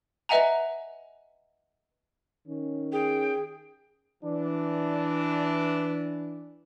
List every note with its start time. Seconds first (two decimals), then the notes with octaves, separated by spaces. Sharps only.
0.29 B4 D#5 E5 F#5 G#5 A#5
2.47 D#3 C#4
2.93 G#4 G5
4.24 E3 D4